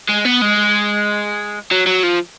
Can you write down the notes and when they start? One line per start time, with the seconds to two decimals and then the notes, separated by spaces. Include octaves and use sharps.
0.09 G#3
0.25 B3
0.41 G#3
1.72 F#3
1.87 F#3
2.03 F3